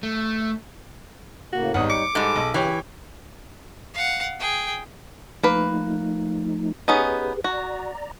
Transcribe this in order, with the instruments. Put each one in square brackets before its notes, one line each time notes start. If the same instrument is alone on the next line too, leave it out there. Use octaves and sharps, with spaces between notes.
[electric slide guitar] A3
[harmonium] A2 C#3 A#3 [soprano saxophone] F#4
[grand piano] G#1 B3 D#6 [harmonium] G3 D#4 C#5 [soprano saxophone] F#5
[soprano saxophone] D6 [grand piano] C#7
[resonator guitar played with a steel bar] G#2 G3 [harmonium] G#4 A4
[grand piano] B1 D#5
[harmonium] G2 C#3 [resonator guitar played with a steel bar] E3 [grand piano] G4 C#5 G5
[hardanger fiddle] F5 F#5
G#4 G5
[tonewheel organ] F3 A3 D#4 [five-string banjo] A#3 B4
[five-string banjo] B3 C#4 D#4 [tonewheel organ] G4 G#4 B4
[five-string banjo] F#4 [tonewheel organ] D5 A#5